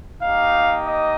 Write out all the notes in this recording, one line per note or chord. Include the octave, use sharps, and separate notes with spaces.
A#3 D#4 G4 F5
D#5